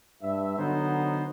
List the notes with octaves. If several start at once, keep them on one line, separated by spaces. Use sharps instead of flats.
G2 E5
D3 F#3 B3 D#4 C5